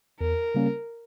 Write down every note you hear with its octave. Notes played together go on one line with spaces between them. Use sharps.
E2 A#4
C#3 G3 A#3 C#4